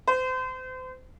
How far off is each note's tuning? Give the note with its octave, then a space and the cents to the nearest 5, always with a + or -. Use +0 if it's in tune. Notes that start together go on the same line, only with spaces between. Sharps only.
C5 -35